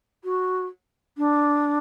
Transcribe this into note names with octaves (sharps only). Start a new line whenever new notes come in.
F#4
D4